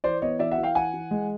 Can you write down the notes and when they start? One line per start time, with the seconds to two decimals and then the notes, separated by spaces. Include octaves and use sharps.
0.04 E3 C5 D5
0.22 B3 C#5 D#5
0.39 E3 D5 E5
0.51 E5 F#5
0.58 E3
0.63 F5 G5
0.75 E3 F#5 G#5
0.94 E3
1.11 G#3